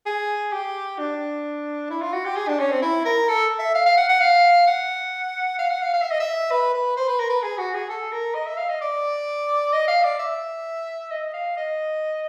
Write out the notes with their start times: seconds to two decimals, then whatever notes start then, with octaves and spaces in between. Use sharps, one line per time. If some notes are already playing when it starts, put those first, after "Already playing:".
0.06 G#4
0.52 G4
0.98 D4
1.90 E4
2.02 F4
2.13 F#4
2.25 G4
2.36 G#4
2.48 D4
2.59 C#4
2.71 C4
2.82 E4
3.05 A#4
3.28 A4
3.59 E5
3.74 F5
3.86 F5
3.97 F#5
4.09 F#5
4.20 F5
4.67 F#5
5.59 F5
5.70 F#5
5.82 F5
5.93 F5
6.01 E5
6.11 D#5
6.20 E5
6.51 B4
6.74 B4
6.97 C5
7.08 B4
7.19 A#4
7.29 B4
7.42 G#4
7.58 F#4
7.74 G#4
7.89 A4
8.12 A#4
8.34 D#5
8.46 E5
8.57 F5
8.69 D#5
8.81 D5
9.72 D#5
9.87 F5
10.03 D5
10.19 E5
11.11 D#5
11.33 F5
11.57 D#5